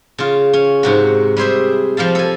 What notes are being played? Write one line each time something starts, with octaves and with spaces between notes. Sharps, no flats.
C#3 F4
C#4
G#2 C3 F#4
G3 G#4 C5 E5
F3 G3 F5 A5
A4 G#5